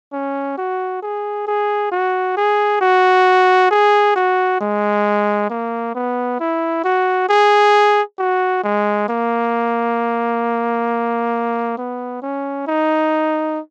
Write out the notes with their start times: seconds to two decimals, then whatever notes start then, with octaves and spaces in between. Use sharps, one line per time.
0.13 C#4
0.58 F#4
1.02 G#4
1.47 G#4
1.92 F#4
2.37 G#4
2.81 F#4
3.71 G#4
4.16 F#4
4.61 G#3
5.50 A#3
5.95 B3
6.40 E4
6.84 F#4
7.29 G#4
8.19 F#4
8.64 G#3
9.09 A#3
11.77 B3
12.22 C#4
12.67 D#4